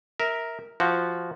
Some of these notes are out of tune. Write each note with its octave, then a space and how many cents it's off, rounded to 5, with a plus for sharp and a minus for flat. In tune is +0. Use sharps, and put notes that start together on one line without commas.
A#4 +0 E5 -20
F3 -10 F#4 +0